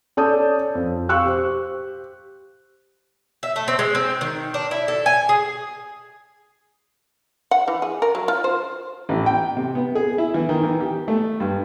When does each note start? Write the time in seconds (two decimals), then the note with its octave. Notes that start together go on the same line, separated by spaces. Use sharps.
0.17 C#4 A4 D5 A5 D#6 G6
0.75 F2
1.09 F5 G5 C#6 E6 F#6
1.26 G4 C5
3.43 E5
3.56 A3
3.68 C4
3.79 G#3
3.95 C4
4.21 D#3
4.54 D4
4.71 E4
4.88 A4
5.06 G#5
5.29 G#4
7.51 F#5
7.68 E3
7.82 G#4
8.02 A#4
8.15 F#3
8.28 F4
8.44 C5
9.09 A1
9.26 G5
9.57 C3
9.75 B3
9.95 G#4
10.18 E4
10.34 E3
10.49 D#3
10.64 E3
10.81 G4
11.08 A3
11.40 G2